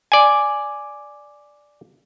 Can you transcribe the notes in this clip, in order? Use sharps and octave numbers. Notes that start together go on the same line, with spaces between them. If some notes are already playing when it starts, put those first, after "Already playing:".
D5 G#5